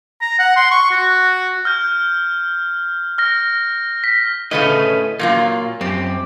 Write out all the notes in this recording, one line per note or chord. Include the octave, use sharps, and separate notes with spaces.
A#5
F#5
C6
C#6
F#4
F6 G6
F6 A#6
B6
A2 C#3 A3 C#4 B4 D#5
A#2 F#3 A#3 F4
F#2 C4 G4